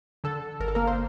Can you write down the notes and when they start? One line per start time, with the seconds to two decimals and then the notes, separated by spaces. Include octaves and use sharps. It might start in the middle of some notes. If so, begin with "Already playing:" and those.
0.24 D3 A4
0.60 G1 A#4
0.68 A4
0.75 A#3 A#4
0.87 C5